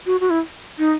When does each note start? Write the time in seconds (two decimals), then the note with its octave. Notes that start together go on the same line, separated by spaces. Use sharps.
0.06 F#4
0.21 F#4
0.30 E4
0.79 D#4